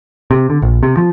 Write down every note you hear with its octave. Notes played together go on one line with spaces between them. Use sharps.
C3
D3
A#1
C3
F3